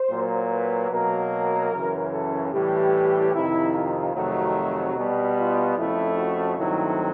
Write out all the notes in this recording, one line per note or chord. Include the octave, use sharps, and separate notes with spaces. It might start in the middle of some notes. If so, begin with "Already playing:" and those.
Already playing: C5
A#2 F#3 A#3
B4
B2 F#3 A#3 A#4
F#2 C#3 E3
A4
A2 E3 G3 G4
F2 C3 D#3 E4
F4
F2 C3 D#3 F#3 A3 F#4
B2 G3 B3
F4
F2 C#3 F3 A3 E4
F#4
G2 D#3 F#3 A3 C4 E4